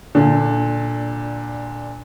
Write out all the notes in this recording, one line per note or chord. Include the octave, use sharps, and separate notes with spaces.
A#2 D3